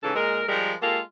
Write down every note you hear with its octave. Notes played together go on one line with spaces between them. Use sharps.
G#2 C#3 E3 A4
A#2 G#3 A#4
F3 G3 G#3 A#4
G#3 A#3 F4 G4 A4